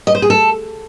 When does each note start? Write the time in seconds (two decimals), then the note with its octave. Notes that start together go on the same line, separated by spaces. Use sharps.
0.07 D#5
0.15 C5
0.22 G#4
0.30 A4